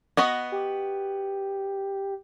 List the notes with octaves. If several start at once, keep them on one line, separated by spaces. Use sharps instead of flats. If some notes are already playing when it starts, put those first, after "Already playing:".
B3 F#4 D#5
G4